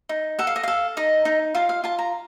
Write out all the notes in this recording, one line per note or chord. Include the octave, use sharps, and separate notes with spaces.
D#4
A4 F#5
F5
D#5
A4 F5
D#4 D#5
D#4
F4 F5
F5
F4 A5
A#5